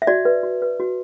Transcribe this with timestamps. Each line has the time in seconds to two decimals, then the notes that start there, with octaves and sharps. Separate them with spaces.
0.02 E5
0.07 F#4 D5
0.25 B4
0.43 F#4
0.62 B4
0.80 F#4